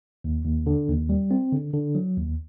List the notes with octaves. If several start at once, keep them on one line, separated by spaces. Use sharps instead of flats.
D#2
D#2
D3
D#2
G3
C4
D3
D3
F#3
D#2